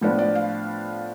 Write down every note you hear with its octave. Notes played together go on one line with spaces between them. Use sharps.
A2 F3 B3 D4
D5
F5